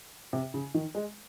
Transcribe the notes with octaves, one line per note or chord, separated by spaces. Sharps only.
C3
C#3
D#3
G#3